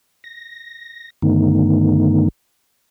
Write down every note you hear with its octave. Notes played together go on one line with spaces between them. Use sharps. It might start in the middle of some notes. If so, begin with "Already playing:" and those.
A#6
G2 D3 D#3 A3 B3 D#4